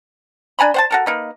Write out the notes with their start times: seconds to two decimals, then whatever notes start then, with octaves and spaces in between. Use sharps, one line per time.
0.59 D4 G#5 A#5 B5
0.74 C5 F#5 A5
0.91 F#4 A4 A#4
1.06 A#3 D#4 B4